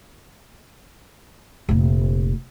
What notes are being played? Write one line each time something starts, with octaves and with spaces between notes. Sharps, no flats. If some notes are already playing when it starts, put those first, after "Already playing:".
F1 A#2